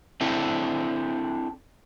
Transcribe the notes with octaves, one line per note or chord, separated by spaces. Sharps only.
C4 D4 E4 A4